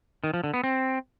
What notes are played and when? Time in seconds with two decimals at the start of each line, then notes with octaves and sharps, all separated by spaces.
0.24 D#3
0.34 F3
0.44 D3
0.54 B3
0.64 C4